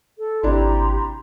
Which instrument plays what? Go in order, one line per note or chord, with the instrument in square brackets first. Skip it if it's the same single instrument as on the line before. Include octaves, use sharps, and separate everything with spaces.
[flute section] A4
[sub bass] G#1 [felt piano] C3 D4 E4 [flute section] G4 A#5 C6